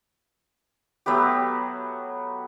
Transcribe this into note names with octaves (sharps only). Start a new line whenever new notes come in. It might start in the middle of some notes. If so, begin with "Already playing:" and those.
F#3 A3 B3 G4